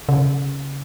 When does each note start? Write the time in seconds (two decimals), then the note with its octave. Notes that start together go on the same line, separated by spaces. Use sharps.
0.09 C#3